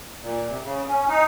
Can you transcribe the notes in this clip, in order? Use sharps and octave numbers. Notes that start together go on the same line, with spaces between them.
A#2
C3
C#3
C#4
D#4